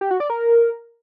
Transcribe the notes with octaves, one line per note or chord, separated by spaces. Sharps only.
G4
F#4
D5
A#4